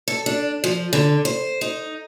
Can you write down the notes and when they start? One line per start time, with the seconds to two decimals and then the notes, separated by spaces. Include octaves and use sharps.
0.08 A4
0.26 D4
0.64 F3
0.93 D3
1.25 C5
1.61 D#4